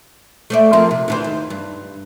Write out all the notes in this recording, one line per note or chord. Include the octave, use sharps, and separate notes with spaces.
A3 C5 D5
F3 A#3 C4
C3
D2 E3 C5
D#2
G2